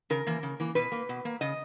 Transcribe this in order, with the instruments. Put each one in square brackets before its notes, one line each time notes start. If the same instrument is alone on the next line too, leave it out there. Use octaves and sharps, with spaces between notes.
[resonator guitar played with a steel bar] C#3 A#4
E3 A#3
C#3
E3 A#3
B2 B4
A#3
B2
A#3
C#3 D#5